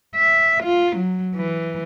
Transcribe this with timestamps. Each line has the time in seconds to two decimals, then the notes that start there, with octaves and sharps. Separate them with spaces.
0.16 E5
0.64 F4
0.97 F#3
1.36 E3